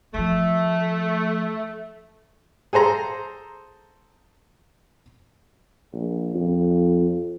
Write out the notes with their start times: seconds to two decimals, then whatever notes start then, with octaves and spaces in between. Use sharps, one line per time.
0.14 D#3 F3 A3
2.73 G#4 A4 C5 A#5
5.93 A#1
6.34 F2